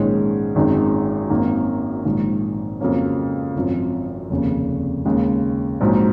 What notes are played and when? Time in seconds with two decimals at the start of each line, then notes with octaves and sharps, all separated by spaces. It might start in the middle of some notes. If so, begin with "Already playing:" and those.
Already playing: A#1 G#2 D#3 G#3 C#4
0.55 G#1 F#2 D#3 G#3 D#4
1.30 G#1 F#2 D#3 A#3
2.05 A#1 G#2 D#3
2.80 F2 C#3 F#3 A#3 C#4
3.56 G#1 F#2 F3
4.30 F1 D#2 C#3
5.05 D#2 C#3 G#3 C#4
5.80 A#1 G#2 F#3 C4 D#4